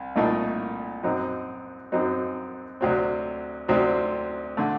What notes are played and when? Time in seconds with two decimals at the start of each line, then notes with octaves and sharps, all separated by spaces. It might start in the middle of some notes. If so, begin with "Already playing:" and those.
Already playing: C2
0.16 C2 A#2 A3 D#4
1.03 F#2 F#3 C4 D#4
1.92 F#2 F#3 C4 D#4
2.81 D2 C3 F#3 C4
3.68 D2 C3 F#3 C4
4.57 D3 A3